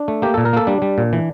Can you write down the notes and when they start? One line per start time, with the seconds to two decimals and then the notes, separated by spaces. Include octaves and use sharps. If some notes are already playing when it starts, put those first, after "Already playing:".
Already playing: D4
0.08 A3
0.22 A#3 G4
0.34 A#2 A4
0.45 A#4
0.53 A#3 A4
0.67 G3 D4
0.82 G3
0.98 A#2
1.13 E3